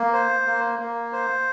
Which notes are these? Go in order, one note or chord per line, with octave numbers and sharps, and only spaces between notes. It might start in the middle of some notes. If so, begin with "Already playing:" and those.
Already playing: A#3
C5
A#3
A#3
C5